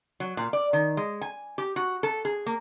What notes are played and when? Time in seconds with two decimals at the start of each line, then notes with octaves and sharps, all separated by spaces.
0.20 F#3
0.37 A#2
0.53 D5
0.73 D#3
0.97 G#3
1.21 G#5
1.58 G4
1.76 F#4
2.03 A4
2.25 G#4
2.46 A#3